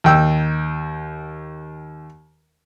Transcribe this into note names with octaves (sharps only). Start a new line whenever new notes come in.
D#2 G5 E6